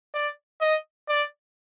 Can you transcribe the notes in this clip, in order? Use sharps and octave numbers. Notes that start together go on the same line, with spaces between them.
D5
D#5
D5